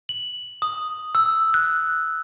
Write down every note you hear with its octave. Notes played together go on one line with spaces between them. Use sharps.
F#7
D#6
E6
F#6